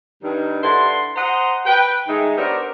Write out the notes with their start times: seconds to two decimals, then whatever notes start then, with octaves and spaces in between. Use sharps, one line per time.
0.23 G2 D#3
0.62 G2 D3 E4 C6
1.16 C5 D#5 F#5 A#5 C6
1.66 B4 G5
2.08 D#3 G#3 A3 D#4
2.37 B3 C4 D4 G4 A#4 C#5